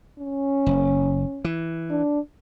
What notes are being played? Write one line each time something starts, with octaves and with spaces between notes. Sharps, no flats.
C#4
F#1
E3
D4